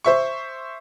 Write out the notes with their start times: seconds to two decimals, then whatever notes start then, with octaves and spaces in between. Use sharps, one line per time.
0.04 C5 E5 C#6